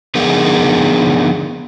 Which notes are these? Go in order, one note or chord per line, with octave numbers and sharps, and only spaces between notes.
D3 F3 B3 D#4 G#4 A#4